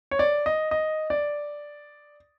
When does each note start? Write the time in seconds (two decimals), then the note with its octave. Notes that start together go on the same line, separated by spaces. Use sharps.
0.11 C#5
0.19 D5
0.46 D#5
0.71 D#5
1.10 D5